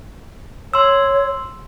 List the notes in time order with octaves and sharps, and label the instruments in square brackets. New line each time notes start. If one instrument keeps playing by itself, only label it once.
[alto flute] C#5 [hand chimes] C6 E6